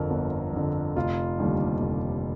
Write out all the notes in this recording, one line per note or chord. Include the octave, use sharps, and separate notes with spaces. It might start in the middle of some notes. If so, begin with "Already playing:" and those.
Already playing: G1 F2 D3 A#4
G1
F2 D3
F1 F4
D#2 D3 G3
F1